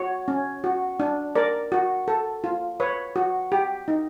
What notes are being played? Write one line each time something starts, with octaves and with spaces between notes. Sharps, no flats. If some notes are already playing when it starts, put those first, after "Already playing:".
Already playing: F#4 C#5
C#4
F#4
D4
A#4 D5
F#4
A4
F4
B4 C#5
F#4
G4
D#4